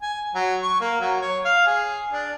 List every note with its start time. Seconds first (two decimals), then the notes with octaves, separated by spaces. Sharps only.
0.02 G#5
0.35 F#3
0.63 C#6
0.81 A#3
1.00 F#3
1.21 C#5
1.45 F5
1.66 G#4
2.13 D4